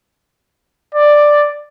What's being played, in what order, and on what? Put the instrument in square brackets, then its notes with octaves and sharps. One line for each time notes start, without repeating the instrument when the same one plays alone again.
[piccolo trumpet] D5